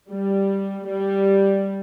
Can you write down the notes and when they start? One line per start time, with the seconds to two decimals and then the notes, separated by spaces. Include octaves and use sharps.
0.10 G3
0.88 G3